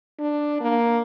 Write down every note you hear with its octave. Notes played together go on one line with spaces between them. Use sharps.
D4
A#3